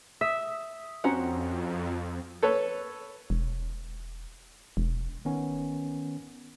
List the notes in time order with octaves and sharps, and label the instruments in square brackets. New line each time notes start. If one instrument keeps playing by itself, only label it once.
[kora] E5 [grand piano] D#6
[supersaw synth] F2 [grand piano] C4 F#4 A#5 [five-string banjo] C#4 F#5
[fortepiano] A4 B4 C#5
[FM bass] E1
E1
[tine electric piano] D#3 B3 C#4